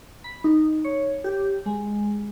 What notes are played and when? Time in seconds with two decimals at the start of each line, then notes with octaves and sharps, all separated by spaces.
0.24 B5
0.44 D#4
0.84 C#5
1.24 G4
1.66 G#3